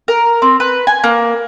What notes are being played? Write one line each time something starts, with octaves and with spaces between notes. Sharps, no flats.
A#4
C4
B4
G#5
A#3